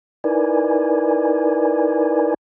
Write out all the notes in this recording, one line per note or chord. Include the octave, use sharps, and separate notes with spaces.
D#4 E4 A#4 B4 D5 G#5